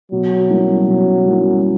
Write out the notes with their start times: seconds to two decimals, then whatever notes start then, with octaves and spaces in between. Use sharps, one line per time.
0.12 B2 F#3
0.50 G3 A#3 C#4 E4
0.87 B2
1.26 G3 A#3 C#4 E4